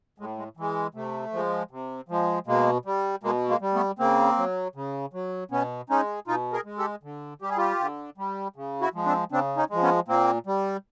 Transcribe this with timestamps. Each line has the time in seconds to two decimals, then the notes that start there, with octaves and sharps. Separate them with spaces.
0.18 A2 G#3
0.38 G#3
0.57 E3 G#3
0.95 C3 A3
1.32 F3 G#3
1.71 C3
2.08 F3 G#3
2.47 B2 G#3 A#3
2.85 G3
3.23 B2 G#3 A#3
3.49 G#3 A#3
3.61 G3
3.74 A3 B3
3.99 C#3 A#3 C4
4.37 F#3
4.75 C#3
5.13 F#3
5.51 B2 B3 C#4
5.89 G#3 C#4 D#4
6.27 B2 D#4 F4
6.53 G#4 A#4
6.65 G#3
6.78 G4 A4
7.03 D3
7.41 G3 G4
7.50 G#4
7.58 F4 G4
7.80 D3
8.18 G3
8.56 C#3
8.81 E4 F#4
8.94 F3 G#3
9.06 C4 D4
9.32 C#3 C4 D4
9.57 C#4 D#4
9.70 F3 G#3
9.82 B3 C#4
10.08 A#2 A#3 C4
10.47 G3